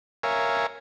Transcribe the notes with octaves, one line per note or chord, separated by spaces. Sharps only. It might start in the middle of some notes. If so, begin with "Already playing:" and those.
A#4 C#5 E5 F5 G#5